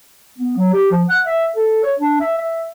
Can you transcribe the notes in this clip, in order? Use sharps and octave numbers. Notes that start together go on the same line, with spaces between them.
B3
F#3
G4
F3
F#5
E5
A4
C#5
D4
E5
E5